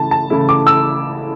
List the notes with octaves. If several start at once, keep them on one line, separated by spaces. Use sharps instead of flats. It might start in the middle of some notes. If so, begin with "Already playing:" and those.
Already playing: C#3 E3 A3 E4 A5
A5
C#3 E3 A3 E4
D6
E6